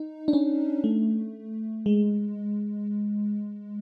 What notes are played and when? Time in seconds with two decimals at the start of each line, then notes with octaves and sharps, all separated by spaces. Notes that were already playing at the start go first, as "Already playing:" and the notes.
Already playing: D#4
0.28 D4
0.33 C#4
0.84 A3
1.86 G#3